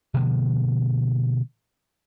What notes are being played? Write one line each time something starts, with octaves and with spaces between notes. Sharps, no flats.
B2 D3 F3 A#3